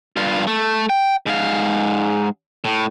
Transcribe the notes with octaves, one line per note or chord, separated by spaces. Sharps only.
G2 F4
A3
G5
G#2 F5
A2